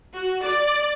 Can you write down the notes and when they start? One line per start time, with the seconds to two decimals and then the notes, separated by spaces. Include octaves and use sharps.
0.16 F#4
0.45 D5